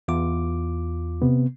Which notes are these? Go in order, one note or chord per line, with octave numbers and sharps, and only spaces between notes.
E2 F4 D6
C3 B3